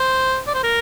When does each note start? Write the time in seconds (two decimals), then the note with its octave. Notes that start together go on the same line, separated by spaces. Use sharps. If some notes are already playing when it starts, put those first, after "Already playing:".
Already playing: C5
0.47 D5
0.54 C5
0.63 A#4